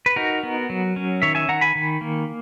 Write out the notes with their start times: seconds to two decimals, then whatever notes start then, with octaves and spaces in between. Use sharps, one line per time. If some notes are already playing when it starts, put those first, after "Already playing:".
0.06 B4
0.16 D#4 F#4 A#4
0.43 B3
0.70 F#3
0.96 C#4
1.22 D#3 C#5 E5
1.35 E5 G#5
1.49 D#3 F#5 A#5
1.61 G#5 B5
1.75 D#3
2.01 A#3